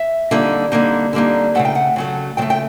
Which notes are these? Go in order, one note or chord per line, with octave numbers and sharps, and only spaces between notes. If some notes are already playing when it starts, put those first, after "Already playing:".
Already playing: E5
D3 G3 A#3 D#4
D3 G3 A#3 D#4
D3 G3 A#3 D#4
C#3 F#3 A3 F#5
G5
F#5
C#3 F#3 A3
C#3 F#3 A3 G5
G5